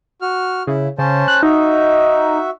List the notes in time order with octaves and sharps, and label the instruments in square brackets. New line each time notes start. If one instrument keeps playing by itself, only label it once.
[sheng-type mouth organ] F#4 F6
[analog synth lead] C#3 [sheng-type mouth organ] E4
[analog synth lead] C#3 [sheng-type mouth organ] C#4 C5 A5
[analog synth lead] F#6
[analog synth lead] D#4 [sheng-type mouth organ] F#4 E5